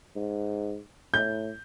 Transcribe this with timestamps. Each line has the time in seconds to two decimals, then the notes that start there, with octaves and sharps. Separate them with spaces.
0.16 G#2
1.14 A2 G6